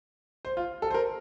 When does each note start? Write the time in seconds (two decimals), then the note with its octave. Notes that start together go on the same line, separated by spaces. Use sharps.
0.45 C5
0.57 F4
0.82 A4
0.91 C5
0.94 A#4